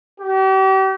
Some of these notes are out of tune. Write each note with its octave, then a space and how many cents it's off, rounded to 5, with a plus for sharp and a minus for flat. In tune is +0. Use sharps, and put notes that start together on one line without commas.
G4 -40